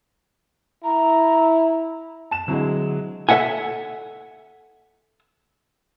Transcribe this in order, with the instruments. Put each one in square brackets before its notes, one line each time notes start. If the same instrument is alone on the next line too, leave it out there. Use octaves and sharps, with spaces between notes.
[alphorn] E4 [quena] A#5
[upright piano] A5 E7
[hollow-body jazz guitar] D3 C4 E4 [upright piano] F#3 G#3
[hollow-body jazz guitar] A4 B4 E5 F#5 G#5